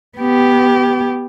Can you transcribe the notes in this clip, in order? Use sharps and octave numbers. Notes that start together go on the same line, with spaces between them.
B3 G4